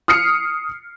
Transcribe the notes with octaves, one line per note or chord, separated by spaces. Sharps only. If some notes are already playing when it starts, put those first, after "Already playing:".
D#6 F6 C7 C#7